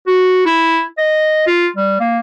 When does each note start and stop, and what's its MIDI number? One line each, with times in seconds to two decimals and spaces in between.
0.07 0.43 66
0.46 0.83 64
0.98 1.43 75
1.47 1.67 65
1.76 1.98 55
2.00 2.19 58